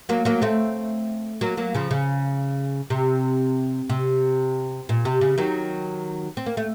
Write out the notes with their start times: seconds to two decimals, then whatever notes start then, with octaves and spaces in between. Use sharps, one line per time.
0.09 F#3 A#3
0.25 F#3 A#3
0.42 A3 C4
1.41 F#3 A#3
1.57 F#3 A#3
1.74 C#3 F3
1.91 C#3
2.90 C3
3.89 C3
4.89 A#2
5.05 C3
5.21 C#3
5.38 D#3 F#3
6.37 C4
6.46 A#3
6.57 A3